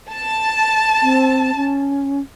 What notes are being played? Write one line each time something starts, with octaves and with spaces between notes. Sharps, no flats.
A5
C4
C#4